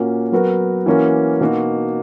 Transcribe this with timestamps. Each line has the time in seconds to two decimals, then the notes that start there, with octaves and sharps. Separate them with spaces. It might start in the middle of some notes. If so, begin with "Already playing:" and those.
Already playing: A#2 A#3 C#4 F#4 A#4
0.32 F#3 B3 F#4 A#4
0.86 E3 A#3 C#4 F#4 A#4
1.40 B2 A#3 D#4 F#4